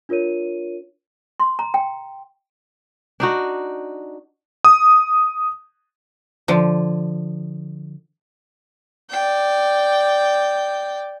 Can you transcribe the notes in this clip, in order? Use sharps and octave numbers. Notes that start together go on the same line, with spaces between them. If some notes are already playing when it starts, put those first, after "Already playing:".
D4 F4 A#4 C#5 D#7
C6
A#5
G5
D4 D#4 F#4
D#6
D3 F3
D5 G5